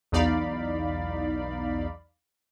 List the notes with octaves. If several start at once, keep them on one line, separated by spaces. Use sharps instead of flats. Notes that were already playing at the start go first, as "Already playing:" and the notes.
B1 E2 D#4 D5 F5 B5